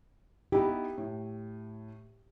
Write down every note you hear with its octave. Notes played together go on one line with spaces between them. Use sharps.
B3 D#4 E4 G4
A2